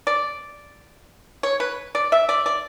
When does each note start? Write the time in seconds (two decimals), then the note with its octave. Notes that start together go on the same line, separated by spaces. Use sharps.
0.07 D5
1.43 C#5
1.60 B4
1.95 D5
2.12 E5
2.29 D5
2.46 D5